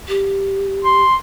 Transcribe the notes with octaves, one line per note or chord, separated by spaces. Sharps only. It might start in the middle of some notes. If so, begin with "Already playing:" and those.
G4
C6